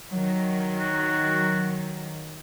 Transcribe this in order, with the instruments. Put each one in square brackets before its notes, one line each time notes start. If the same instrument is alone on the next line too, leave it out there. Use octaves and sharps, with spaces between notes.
[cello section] D#3 F#3
[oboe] F#4